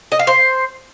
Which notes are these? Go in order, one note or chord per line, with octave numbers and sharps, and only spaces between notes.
D#5
F5
C5